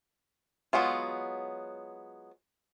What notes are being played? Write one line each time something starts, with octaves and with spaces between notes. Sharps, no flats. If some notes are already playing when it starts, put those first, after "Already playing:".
F#3 G#3 B3 F4